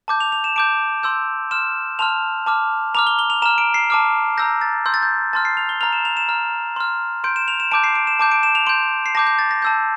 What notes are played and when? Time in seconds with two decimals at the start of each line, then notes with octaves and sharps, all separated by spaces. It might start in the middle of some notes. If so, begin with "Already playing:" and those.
0.08 A5 D6 G6
0.20 F7
0.32 F7
0.44 E7
0.56 A5 D6 G6 D7
1.03 C6 E6 G6
1.51 C6 F6 E7
1.99 A5 C6 F6 F7
2.46 A5 D6 F6
2.95 A#5 D6 F6 F7
3.07 G7
3.19 G7
3.30 F7
3.42 A#5 F6 E7
3.58 D7
3.74 C7
3.90 A5 D6 F6
4.37 A#5 E6 G6 A#6
4.61 A6
4.86 C6 E6 G6
4.94 A6
5.03 G6
5.33 A5 C6 F6 A6
5.45 C7
5.57 F7
5.69 G7
5.81 A#5 F6 F7
5.93 E7
6.05 F7
6.17 E7
6.28 A#5 F6
6.76 C6 F6
7.24 C6 G6 D7
7.36 E7
7.48 F7
7.60 E7
7.71 A5 D6 G6 D7
7.84 C7
7.95 D7
8.07 E7
8.19 A5 D6 G6
8.32 D7
8.43 E7
8.55 F7
8.67 C6 G6 D7
9.06 C7
9.15 A5 D6 G6 A#6
9.27 G6
9.39 A6
9.51 A#6
9.62 A5 E6 G6